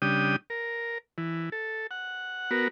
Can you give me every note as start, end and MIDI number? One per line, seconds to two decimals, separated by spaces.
0.02 0.36 49
0.02 0.36 55
0.02 0.36 62
0.02 0.36 79
0.02 0.36 87
0.50 0.98 70
1.18 1.50 52
1.52 1.87 69
1.91 2.50 78
2.51 2.68 59
2.51 2.68 66
2.51 2.68 70